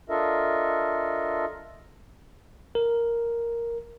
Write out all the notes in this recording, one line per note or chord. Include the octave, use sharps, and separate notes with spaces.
D4 F4 A4 A#4 D#5 E5
A#4